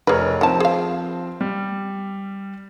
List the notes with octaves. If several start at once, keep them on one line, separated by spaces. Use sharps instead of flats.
F1 G#4 A#4 B4 C#5
D#3 F3 C4 A5
G#4 F5
G3